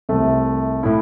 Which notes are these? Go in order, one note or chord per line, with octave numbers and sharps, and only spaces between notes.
C2 C3 A3
A2 A3 E4